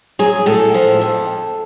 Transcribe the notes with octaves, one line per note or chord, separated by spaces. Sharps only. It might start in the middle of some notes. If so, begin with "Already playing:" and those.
F#3 G#4
A2 A4
F3
F2